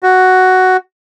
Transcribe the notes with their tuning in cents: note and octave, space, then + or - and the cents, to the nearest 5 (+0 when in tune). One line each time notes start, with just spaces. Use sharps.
F#4 +5